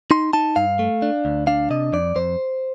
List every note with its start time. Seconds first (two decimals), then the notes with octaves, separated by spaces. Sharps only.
0.11 D#4 C6
0.33 D#4 A5
0.56 G2 F5
0.79 A3
1.02 D4
1.25 D2
1.47 D4 F5
1.70 C3 D#5
1.93 F2 D5
2.16 F2 C5